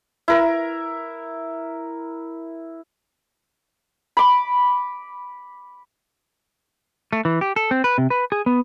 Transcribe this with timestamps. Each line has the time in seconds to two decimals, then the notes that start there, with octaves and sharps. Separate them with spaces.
0.28 E4 A#4
4.17 B5 D6
7.13 A3
7.25 E3
7.41 G4
7.56 A4
7.71 C4
7.84 B4
7.98 C3
8.10 B4
8.32 G#4
8.46 B3